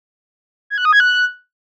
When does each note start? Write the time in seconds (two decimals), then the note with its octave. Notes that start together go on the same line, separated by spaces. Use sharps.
0.70 G#6
0.78 F#6
0.85 D#6
0.93 G#6
1.00 F#6